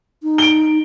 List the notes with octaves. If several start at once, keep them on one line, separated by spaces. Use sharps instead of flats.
D#4
D7 G7